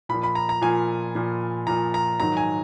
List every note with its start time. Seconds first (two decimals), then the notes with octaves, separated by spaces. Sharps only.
0.09 A#2 B5
0.14 F3
0.23 B5
0.35 A#5
0.49 A#5
0.62 A#2 F3 G#5
1.15 A#2 F3
1.67 A#2 F3 A#5
1.94 A#5
2.20 G#2 D#3 F#3 A#5
2.37 G#5